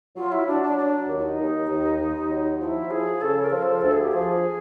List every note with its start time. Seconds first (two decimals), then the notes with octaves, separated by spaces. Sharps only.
0.16 F#3 F4
0.32 E4
0.47 F#3 D4
0.63 D4
0.78 F#3 D4
1.08 D#2
1.19 E4
1.22 D#4
1.39 D#2
1.69 D#2
1.99 D#2
2.30 F#3
2.61 F3 E4 F4
2.91 F3 G#4
3.21 C#3 A4
3.42 A#4
3.52 F3
3.62 A4
3.83 D2 A4
3.93 G#4
4.04 G4
4.13 F3 G#4